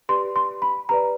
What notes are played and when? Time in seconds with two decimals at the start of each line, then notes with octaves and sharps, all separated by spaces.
0.09 G4 B4 D5 C6
0.36 C6
0.62 B5
0.89 G4 B4 D5 A#5